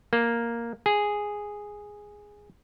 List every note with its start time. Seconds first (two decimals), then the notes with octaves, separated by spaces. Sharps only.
0.13 A#3
0.86 G#4